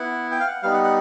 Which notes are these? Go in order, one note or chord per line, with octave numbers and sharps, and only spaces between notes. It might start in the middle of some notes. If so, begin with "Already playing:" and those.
Already playing: B3 E4 F#5
G5
F5
F#5
G3 B3 D#4 F5
F#5
F#5